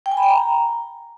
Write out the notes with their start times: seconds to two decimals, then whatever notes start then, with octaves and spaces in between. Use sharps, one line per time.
0.06 G5
0.11 G#5
0.17 B5
0.23 G5
0.29 A#5